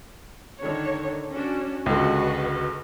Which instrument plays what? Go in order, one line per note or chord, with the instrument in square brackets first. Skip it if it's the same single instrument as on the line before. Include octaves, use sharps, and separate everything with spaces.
[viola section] D3 D#3 C#5
C#4 D4 F#4
[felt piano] C#2 D3 [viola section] F#4 B4 D#5